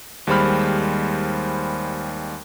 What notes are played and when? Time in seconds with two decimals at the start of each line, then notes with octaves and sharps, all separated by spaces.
0.27 D#2 G3 G#3 C5 B5 F6